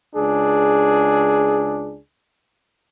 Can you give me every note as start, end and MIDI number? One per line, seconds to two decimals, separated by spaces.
0.15 1.98 37
0.15 1.98 62
0.15 1.98 68